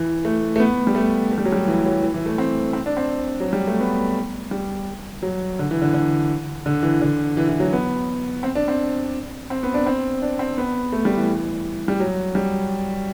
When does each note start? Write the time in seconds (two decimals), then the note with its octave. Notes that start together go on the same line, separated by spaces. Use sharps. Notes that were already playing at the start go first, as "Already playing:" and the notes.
Already playing: E3
0.25 A3
0.56 A3
0.59 B3
0.87 G3
0.95 A3
1.32 A3
1.38 G3
1.45 F#3
1.52 G3
1.67 E3
1.85 F#3
2.02 E3
2.14 E3
2.26 A3
2.38 C4
2.73 C4
2.86 D4
2.97 C4
3.40 F#3
3.53 G3
3.67 A3
3.80 B3
4.51 G3
5.23 F#3
5.59 D3
5.71 E3
5.82 D3
5.94 D3
6.66 D3
6.83 E3
7.02 D3
7.37 E3
7.48 E3
7.60 F#3
7.73 B3
8.43 C4
8.55 D4
8.68 C4
9.50 C4
9.63 B3
9.74 D4
9.86 C4
10.22 D4
10.39 C4
10.58 B3
10.93 A3
11.05 G3
11.17 E3
11.88 G3
12.00 F#3
12.35 G3